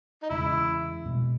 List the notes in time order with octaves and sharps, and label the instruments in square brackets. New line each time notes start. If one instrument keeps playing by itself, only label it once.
[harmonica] D#4
[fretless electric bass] E2 C#3 G#3 [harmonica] E4
[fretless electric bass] B2 G#3 B3